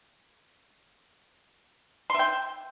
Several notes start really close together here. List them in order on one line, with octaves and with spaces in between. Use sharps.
C6 E5 G5